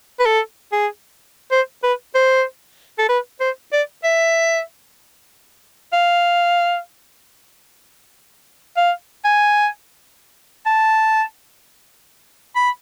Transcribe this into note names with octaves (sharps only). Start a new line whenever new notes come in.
B4
A4
G#4
C5
B4
C5
A4
B4
C5
D5
E5
F5
F5
G#5
A5
B5